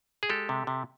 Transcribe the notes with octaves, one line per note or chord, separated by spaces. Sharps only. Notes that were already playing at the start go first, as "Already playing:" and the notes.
G#4
G#3 G4 A4
C3
C3